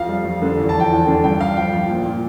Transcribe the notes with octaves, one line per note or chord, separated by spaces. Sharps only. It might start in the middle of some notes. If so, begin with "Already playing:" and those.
Already playing: F2 F3 F5
G3
F2
D3
E2
F3 A5
G5
E2
D3
G2 G5
G2 F5
F3 G5
F3
A#2
A#2